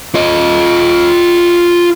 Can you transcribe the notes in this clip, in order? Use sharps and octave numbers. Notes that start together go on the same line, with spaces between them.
F4 D#5